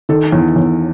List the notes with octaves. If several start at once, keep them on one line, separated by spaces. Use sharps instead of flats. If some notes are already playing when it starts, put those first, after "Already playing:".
D#3 A4
E2
E2